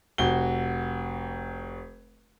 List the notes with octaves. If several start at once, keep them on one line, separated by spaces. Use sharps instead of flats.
F1 F#4 G7